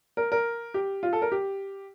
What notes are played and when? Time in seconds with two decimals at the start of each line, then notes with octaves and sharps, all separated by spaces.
0.17 A#4
0.32 A#4
0.74 G4
1.03 F4
1.13 A4
1.22 A#4
1.32 G4